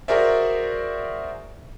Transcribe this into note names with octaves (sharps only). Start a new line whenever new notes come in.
F#4 G#4 A#4 C5 D5 E5